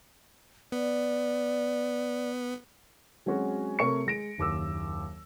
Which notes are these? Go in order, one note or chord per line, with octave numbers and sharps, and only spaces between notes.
B3 D5
F#3 G#3 C4 C#4 F#4
C3 A3 A#4 C#5 C#6 C#7
G#3 A#6 D7
F#1 D#2 D6 E6